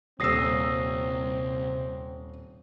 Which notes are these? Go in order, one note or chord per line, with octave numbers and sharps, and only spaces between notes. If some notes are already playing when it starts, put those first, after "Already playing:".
D#1 C2 C4 D#6 E6 A#6 C7